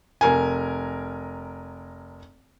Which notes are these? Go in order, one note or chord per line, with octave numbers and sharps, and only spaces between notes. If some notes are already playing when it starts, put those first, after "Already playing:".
F1 A#4 G#5